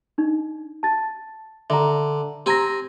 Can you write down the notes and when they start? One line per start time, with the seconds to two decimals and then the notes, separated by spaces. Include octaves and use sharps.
0.18 D4 D#4
0.83 A5 A6
1.70 D3 E5 A#5
2.46 C4 G4 G#5 A#5 A#6